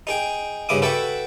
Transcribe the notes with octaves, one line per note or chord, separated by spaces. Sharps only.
D#4 G#4 G5
G2 C#3 E4 D6 D#6
F#4 A4 B4 E5 F#5 G5